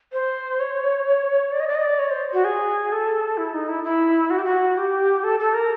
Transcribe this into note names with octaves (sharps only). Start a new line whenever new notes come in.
C5
C#5
D5
D#5
D5
D#5
D5
C#5
C5
F#4
G#4
A4
E4
D#4
E4
E4
F#4
G4
F#4
G4
A4
A4
A#4